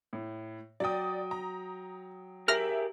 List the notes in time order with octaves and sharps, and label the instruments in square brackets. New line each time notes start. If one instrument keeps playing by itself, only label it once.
[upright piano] A2
[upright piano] F#3 G5 [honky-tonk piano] D5 D#6
[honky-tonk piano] A#5
[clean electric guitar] G4 G#4 A#4 [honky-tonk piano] E5 F#7 [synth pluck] F6 A#6